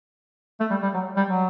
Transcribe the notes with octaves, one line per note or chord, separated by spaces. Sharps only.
A3
G3
G3
F#3
G3
F#3